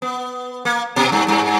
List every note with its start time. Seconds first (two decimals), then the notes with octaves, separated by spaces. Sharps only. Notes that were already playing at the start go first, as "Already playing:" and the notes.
0.02 B3
0.65 A#3
0.96 A#2
1.12 G2
1.28 G2